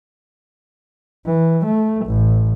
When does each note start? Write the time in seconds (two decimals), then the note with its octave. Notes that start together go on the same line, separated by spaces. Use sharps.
1.26 E3
1.66 A3
2.06 A1